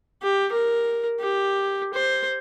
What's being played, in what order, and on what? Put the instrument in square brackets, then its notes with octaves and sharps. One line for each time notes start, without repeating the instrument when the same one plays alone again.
[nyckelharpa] G4
A#4
G4
C5